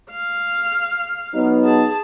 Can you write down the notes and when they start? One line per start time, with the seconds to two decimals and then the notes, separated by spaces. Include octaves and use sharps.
0.11 F5
1.34 F#3 B3 D#4
1.64 G#4 A5